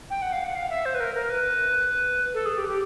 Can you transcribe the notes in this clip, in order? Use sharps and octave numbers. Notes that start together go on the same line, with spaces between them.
G5
F#5
F5
F#5
F5
E5
C5
B4
A#4
A#4
B4
A4
G#4
G4
G4